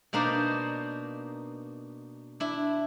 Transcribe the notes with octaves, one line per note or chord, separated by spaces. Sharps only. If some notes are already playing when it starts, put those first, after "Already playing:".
B2 A#3 D4 D#4 C5 D5
D4 E4